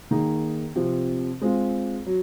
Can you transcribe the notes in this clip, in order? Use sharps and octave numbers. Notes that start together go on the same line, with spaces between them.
D#3 A#3 D#4 G#4
C3 F3 C4
G#3 C4 F4
F#3